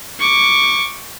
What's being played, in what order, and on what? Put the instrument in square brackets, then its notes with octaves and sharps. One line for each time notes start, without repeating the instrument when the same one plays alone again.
[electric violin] C#6 D6